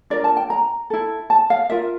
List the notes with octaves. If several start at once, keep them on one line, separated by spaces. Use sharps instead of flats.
D4 F4 A#4 D5
A5
G5
A#5
E4 A4
A5
F5
F4 A#4 E5